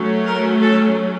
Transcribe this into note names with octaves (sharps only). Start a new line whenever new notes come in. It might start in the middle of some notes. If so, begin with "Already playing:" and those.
Already playing: F#3 A3 C#4
A#4
A4